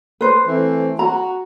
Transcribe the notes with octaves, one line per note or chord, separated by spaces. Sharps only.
B4 C5
E3 A3 C4
F#4 A#5